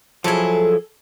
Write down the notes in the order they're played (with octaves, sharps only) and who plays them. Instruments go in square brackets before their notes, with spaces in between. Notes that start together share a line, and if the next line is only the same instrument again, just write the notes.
[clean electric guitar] F3 F#3 E4 [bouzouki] G#4 A4